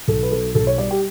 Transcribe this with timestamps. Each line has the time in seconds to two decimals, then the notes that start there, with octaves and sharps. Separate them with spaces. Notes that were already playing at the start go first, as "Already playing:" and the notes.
0.08 B1 A4
0.22 B4
0.31 B2 A4
0.55 B1 A4
0.67 C#5
0.78 G3 D5
0.91 G4